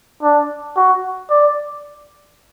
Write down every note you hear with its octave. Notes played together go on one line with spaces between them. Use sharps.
D4
F#4
D5